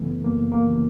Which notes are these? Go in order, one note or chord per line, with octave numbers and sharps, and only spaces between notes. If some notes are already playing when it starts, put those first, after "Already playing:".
Already playing: F#2 C#3 E3 A3 B3
F#2 A#3
A#3
C#3 E3